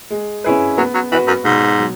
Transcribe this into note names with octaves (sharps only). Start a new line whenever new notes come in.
G#3
C#4 E4 G#4 B4
F#3 B3
F#3
E3 F#4 B4
F#2
G#2 B2
F#3